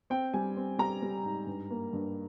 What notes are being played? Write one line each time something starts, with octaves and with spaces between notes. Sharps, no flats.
C4 G5
G3 G#5
C4
G3 A#5
G3
G#2
G2
A#3
G2